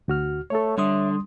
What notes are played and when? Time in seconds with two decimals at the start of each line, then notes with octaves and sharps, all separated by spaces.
0.08 D2 F#4 F6
0.50 A3 A4 C#5
0.78 D3 G3 E5 C6 D#6